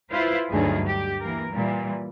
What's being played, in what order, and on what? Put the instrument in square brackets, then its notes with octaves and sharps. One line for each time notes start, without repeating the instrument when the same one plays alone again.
[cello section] E4 F4 B4 C5
D2 G2 F#3 D#4 G#4 B4
G4
E3 A#3 A#4
A#2 E3 G3